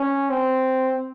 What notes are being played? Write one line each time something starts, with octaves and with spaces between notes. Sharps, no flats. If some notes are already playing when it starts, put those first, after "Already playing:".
Already playing: C#4
C4